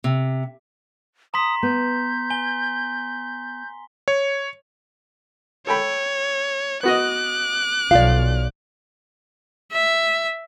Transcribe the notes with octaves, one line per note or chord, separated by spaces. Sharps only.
C3
A#5 C6 D#6 B6
B3 G6
G#5 G7
C#5
A4 C#5 G5 B5
B3 F#4 D#5 D6 F#6
B1 F3 D5 F5
E5